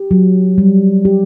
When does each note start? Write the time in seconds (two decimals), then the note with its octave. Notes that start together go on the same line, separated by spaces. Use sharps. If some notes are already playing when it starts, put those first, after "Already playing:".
Already playing: G4
0.11 F#3
0.58 G3
1.05 G4